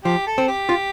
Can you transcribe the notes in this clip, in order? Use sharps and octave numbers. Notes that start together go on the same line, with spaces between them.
F3 G4
A4
C4
G4
F4